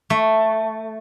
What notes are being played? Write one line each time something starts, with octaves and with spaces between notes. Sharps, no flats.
A3